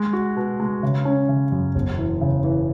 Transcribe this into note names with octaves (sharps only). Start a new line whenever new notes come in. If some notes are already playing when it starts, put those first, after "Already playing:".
Already playing: G#3
F#4
B2
G#3
C#3
C#4
C#3
F#2
E1
E3
C#3
E3